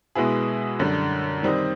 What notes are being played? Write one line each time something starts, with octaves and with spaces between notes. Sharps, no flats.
B2 G#3 B3 E4 G#4
F#2 D3 G3
D#3 G3 C4 D#4